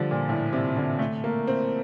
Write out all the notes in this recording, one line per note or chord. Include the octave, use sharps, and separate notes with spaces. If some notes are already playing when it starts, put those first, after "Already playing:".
Already playing: D3 F3 G3
A#2
A2
C3
D3
A3
A#3
C4